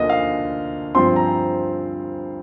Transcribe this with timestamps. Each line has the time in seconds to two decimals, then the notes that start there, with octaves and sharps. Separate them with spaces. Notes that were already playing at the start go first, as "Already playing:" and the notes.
Already playing: D2 D3 F3 A#3 D#5
0.10 F5
0.95 G2 F3 C4 C6
1.16 A#5